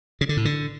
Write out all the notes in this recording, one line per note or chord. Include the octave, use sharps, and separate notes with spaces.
C#3
D3
A2
D3